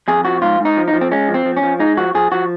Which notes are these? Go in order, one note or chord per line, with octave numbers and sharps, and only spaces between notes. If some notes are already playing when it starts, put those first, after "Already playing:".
F2 G#4
F3 F#4
G#2 F4
G#2
D#4
F3
D#4
F3
C4
G#3 C#4
F3
C4
F3
C#4
F3
G#3 D#4
F3 F#4
F3 G#4
F3 F#4